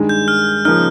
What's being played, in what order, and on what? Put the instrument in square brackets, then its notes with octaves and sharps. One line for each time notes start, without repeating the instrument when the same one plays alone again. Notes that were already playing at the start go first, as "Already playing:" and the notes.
Already playing: [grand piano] G2 D#3 G#3
[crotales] G6
F6
[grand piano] C#3 F3 A#3 D#4 [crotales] F6